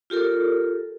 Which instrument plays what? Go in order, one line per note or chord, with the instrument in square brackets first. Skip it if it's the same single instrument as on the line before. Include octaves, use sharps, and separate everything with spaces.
[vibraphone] F4 G4 A4 A#4